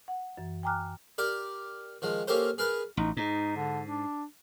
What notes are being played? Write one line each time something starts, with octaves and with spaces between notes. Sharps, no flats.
F#5
F#2 E3
G5 G#5 A#5 D6 F6 F#6
G4 A#4 D5
D#3 F3 G#3
A#3 C#4 G4 A4 A#4 C5
G#4 A#4 B4
A1 D#4
G#2 D#4
D3
D4